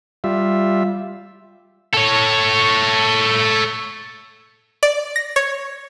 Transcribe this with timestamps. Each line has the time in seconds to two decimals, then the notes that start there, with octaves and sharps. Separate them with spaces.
0.24 G3 F4 E5
1.94 A4 C#5
4.83 D5
5.16 A#6
5.36 C#5